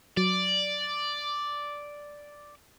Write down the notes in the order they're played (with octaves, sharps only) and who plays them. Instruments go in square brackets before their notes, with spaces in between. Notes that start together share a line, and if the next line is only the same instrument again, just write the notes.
[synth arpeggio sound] F#3 [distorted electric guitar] D5